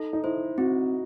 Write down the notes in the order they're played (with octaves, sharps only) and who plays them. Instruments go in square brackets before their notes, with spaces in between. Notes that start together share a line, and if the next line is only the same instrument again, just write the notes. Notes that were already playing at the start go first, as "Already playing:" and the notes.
Already playing: [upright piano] D#4 [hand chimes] A4
[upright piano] D#4
[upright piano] E4 [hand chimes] C5
[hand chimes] C4 [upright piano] F#4